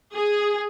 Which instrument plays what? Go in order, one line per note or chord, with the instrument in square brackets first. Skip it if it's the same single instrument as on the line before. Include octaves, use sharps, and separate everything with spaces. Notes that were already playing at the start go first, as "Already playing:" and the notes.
[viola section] G#4